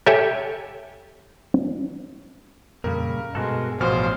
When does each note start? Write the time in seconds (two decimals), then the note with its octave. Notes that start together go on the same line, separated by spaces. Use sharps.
0.06 G4 A4 C#5 E5 G5 G#5
2.84 F2 A#2 C#3 G3 A#4
3.35 G2 B2 G#3 F#4 A4
3.80 A1 B2 F3 C5 F6